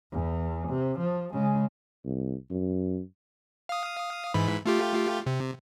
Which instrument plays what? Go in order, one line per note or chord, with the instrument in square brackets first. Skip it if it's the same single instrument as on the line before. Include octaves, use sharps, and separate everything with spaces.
[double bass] E2
C3
F3
C#3 G#3
[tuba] C2
F#2
[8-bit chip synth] F5 D#6
G#2 E3 B5
A3 F4 G4
C3